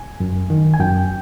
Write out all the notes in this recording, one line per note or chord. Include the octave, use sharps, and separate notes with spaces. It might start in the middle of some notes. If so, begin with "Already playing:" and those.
Already playing: G#5
F#2
D#3
G#5
F#2 G5